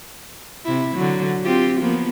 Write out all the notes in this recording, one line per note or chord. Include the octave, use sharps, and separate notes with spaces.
C3 E4
D3 F#3
C4 F4 G4
F3 A#3 B3